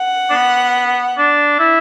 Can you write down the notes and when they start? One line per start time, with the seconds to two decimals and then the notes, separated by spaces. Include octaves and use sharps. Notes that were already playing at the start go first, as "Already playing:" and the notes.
Already playing: F#5
0.30 D4
0.33 B3
1.17 D4
1.59 E4